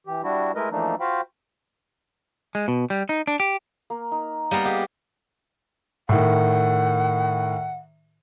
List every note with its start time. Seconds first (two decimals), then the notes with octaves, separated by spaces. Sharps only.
0.07 E3 G4
0.23 G3 D4 E4 F#4
0.55 G#3 A3 E4 A#4 B4 D#5
0.71 E3 F3 A3 A#3 D4 D#4
1.00 F4 F#4 C5 F5 G5 B5
2.55 G#3
2.68 B2
2.90 G3
3.09 D#4
3.27 D4
3.40 G4
3.90 A#3
4.12 D#4
4.51 G3 A#3 B3 F5
4.65 G4 G#4 D#5 F#5
6.09 A2 D#3 F#5